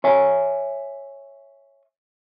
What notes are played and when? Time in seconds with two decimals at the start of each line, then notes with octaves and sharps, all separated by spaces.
0.04 C#5 E5 G#5